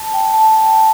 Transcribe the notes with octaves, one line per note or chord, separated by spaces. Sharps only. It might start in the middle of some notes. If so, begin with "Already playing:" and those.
Already playing: A5
G5
A5
G5